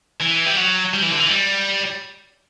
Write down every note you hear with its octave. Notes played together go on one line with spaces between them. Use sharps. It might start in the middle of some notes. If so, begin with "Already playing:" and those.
E3
G3
F#3
G3
E3
D3
E3
G3